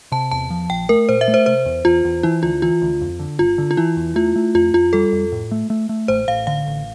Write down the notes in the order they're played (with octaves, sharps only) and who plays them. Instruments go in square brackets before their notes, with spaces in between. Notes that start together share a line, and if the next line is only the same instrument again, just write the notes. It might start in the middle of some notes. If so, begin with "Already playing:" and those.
[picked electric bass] C3 [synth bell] A5
[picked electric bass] E2 [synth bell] A5
[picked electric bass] F3
[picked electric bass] A#1 [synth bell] G5
[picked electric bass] A3 [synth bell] A#4
[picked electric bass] A#2 [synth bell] C5
[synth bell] E5
[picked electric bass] A3
[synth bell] C5
[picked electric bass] C3 [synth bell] C5
[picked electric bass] E2
[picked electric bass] E2 [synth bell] F4
[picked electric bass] E2
[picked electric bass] E3 [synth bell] E4
[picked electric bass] D2 [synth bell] F4
[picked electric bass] E3 [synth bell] F4
[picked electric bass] D2
F2
D3
[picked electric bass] G1 [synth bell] F4
[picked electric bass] D3
[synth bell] F4
[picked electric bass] E3 [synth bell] E4
[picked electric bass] E2
[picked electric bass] A3 [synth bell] F4
[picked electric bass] A3
[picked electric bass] F2 [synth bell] F4
[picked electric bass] F2 [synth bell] F4
[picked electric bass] G3 [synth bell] A4
[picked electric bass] F2
A2
A3
A3
A3
[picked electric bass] A1 [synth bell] C5
[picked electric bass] A1 [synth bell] F5
[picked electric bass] D3 [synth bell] F5
[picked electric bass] A1